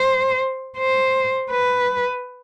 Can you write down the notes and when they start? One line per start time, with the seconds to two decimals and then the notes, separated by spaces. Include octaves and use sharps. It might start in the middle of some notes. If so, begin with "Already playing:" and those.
Already playing: C5
0.78 C5
1.51 B4